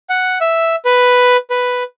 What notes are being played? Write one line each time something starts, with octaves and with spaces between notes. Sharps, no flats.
F#5
E5
B4
B4